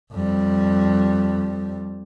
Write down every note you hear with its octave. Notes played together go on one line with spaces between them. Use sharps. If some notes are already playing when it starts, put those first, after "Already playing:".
F2 G3